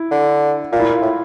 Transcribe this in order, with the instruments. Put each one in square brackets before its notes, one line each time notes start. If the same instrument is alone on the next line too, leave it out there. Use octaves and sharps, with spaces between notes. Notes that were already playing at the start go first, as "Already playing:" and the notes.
Already playing: [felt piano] E4
[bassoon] D3
[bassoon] A#2 [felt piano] F4
[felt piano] E4
F4
[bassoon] A2